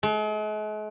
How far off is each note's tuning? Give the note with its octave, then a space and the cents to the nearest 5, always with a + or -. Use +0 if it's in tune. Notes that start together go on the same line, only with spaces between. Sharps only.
G#3 +45